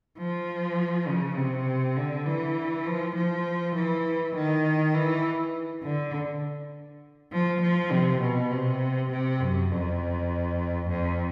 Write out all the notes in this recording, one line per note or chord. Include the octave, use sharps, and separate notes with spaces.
F3
C#3
C3
D3
E3
F3
F3
E3
D#3
E3
D3
F3
F3
C3
B2
C3
C3
F#2
F2
F2